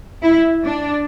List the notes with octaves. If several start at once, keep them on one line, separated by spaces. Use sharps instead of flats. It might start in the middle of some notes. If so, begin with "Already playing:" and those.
E4
D4